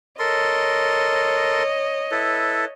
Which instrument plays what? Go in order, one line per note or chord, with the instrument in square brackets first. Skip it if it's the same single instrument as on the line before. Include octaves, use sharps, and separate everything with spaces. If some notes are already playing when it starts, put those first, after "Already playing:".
[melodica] A4 A#4 C6 [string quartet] C#5 D#5
[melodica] E4 A4 B4